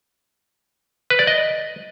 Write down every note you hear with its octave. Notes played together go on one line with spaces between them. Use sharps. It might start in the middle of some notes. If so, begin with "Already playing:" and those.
B4
D5
D#5